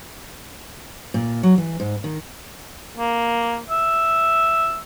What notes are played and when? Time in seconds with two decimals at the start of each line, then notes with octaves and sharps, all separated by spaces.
1.14 A#2
1.43 F#3
1.58 E3
1.80 G#2
2.04 D#3
2.98 A#3
3.70 E5